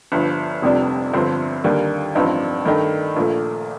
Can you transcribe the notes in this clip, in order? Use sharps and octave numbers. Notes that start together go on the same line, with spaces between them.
G1 G2 F3
F1 F2 C3 G3 D4
G1 G2 D3 F3 C4
D#2 D3 G3 A#3
A1 G2 F3 C4 D#4
G2 D#3 A3 D#4
A#1 A#2 A3